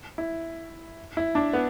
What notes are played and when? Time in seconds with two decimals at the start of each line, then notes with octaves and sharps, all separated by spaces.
0.18 E4
1.17 E4
1.35 D4
1.53 B3